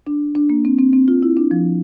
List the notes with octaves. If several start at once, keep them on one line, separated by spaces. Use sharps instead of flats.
D4
D4
A#3
C4
C4
C4
F4
E4
D4
F3